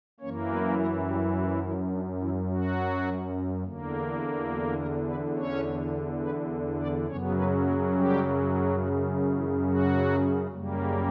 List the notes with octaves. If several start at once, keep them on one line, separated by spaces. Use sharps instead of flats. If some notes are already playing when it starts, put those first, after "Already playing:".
F#2 E3 A#3 C#4 C#5
B3 B4
A#3 A#4
G3 G4
F#3 F#4
E3 E4
D4
E3 E4
F#3 F#4
E2 D3 A#3
F#3 F#4
A#3 A#4
B3 B4
C#4 C#5
B3 B4
D4 D5
F#2 C#3 F#3 B3 C#4 C#5
B3 B4
A#3 A#4
G3 G4
F#3 F#4
E3 E4
F#3 F#4
F#2 C#3 G3 A#3